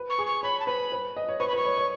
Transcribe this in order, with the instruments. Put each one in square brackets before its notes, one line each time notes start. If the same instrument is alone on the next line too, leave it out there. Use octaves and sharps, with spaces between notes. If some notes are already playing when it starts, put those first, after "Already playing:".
Already playing: [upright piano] B4
[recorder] C#6
[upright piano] G#4
[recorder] C#6
[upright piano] C#5 [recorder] B5
[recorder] A5
[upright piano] B4 [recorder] B5
[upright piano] B4
D#5
C#5
[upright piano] B4 [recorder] C#6
[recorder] B5
[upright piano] B4 [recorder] C#6
[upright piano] C#5
C#5